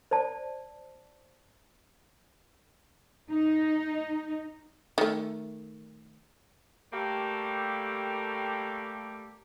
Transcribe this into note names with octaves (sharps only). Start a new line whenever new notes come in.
C5 D5 A5
D#4
D#3 A3
G3 A3 A#3 G4 A4